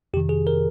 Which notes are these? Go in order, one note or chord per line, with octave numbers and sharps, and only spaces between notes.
F2 C3 D#3 G4
G#4
A#4